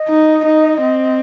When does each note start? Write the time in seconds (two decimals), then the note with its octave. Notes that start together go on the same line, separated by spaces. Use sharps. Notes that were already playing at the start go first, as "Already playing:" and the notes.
Already playing: D#5
0.09 D#4
0.45 D#4
0.81 C4